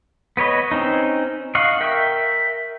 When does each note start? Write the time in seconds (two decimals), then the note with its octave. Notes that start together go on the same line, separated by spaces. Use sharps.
0.37 B3 B4 C#5 D#5
0.71 C4 C#4 D#4
1.55 D#5 F5 F#5 C#6
1.80 A#4 E5 G5